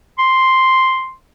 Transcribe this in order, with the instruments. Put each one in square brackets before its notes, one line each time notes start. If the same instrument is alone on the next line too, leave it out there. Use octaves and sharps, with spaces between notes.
[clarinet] C6